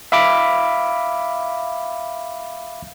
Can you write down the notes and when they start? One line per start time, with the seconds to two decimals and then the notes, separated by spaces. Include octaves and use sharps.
0.12 E5 F5 B5 D6